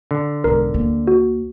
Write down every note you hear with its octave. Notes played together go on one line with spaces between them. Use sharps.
D3
B1 G#2 A#4
D2 A#3
F#4